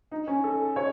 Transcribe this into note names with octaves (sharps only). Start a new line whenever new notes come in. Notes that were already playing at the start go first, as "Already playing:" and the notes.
D#4
C#4
A4
C#5